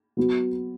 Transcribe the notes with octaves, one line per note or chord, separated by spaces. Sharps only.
F#3 B3 F#4